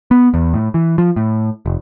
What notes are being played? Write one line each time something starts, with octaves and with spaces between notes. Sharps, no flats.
B3
E2
A2
E3
F3
A2
F1